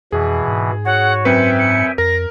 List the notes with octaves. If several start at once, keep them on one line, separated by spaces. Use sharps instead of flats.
F2 B2 E3 G#4
G#2
F#4 C#5 F#5
F#2 C4 B4 E5 G5 G#5 C#7
C#7
F2 A#4 A#6